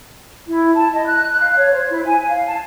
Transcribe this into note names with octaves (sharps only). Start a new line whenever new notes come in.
E4
A5
D#5
F#6
F5
C#5
C5
E4
G#5
F5
A5